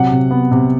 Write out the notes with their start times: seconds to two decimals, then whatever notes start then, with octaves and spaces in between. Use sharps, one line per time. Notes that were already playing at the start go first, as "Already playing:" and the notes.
Already playing: C3 F#3 F#5
0.11 C3
0.31 B3
0.51 C3